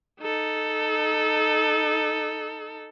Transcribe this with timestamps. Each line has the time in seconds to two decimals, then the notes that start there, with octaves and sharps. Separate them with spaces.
0.21 D#4 A4